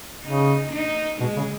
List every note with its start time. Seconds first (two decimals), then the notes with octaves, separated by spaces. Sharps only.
0.23 C#3 D#4
0.71 D#4
1.20 B2 G#3
1.36 C#3